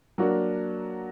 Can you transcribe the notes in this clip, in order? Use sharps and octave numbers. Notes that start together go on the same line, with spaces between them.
F#3 A#3 D4 F#4 A#4